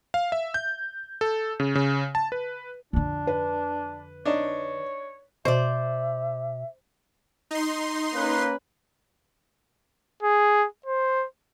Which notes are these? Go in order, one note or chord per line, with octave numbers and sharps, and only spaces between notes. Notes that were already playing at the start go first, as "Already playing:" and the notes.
F5
E5
G6
A4
C#3
C#3
A5
B4
F2 D3 D4
B4
D4 D#4 C#5
B2 C5 D5 E5
D#4 C6
A#3 C#4 B4
G#4
C5